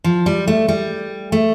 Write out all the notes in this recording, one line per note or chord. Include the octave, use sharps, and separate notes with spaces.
F3
G3
A3
G3
A3